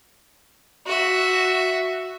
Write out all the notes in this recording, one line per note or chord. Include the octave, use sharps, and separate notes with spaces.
F#4 E5